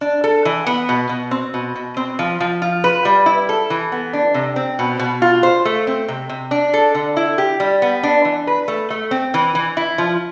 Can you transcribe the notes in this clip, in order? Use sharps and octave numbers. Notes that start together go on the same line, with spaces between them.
D4
A4
E3
B3
B2
B2
C4
B2
B2
C4
F3
F3
F4
B4
G3
E4
A4
E3
B3
D4
C3
C4
B2
B2
F4
C5
A3
C4
C3
C3
D4
A4
D3
E4
G4
G3
B3
D4
E3
B4
A3
A3
C4
E3
E3
E4
F3